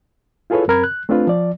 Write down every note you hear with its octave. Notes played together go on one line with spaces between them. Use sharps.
E4 F4 G#4 A4 B4 C#5
F#2 C4 A#4 B5 G#6
F#6
A3 C4 D4 F4 B4
F3 D5